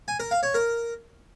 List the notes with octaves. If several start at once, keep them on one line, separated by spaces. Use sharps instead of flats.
G#5
A#4
F5
C#5
A#4